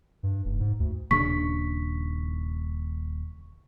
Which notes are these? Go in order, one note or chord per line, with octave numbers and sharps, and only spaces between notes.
G2
F1
G#2
D2
D#1 C#3 D4 C#6 B6